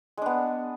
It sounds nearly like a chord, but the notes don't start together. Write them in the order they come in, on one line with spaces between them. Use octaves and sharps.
G#3 D4 B3